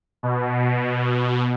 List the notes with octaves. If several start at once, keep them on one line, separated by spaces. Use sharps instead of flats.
B2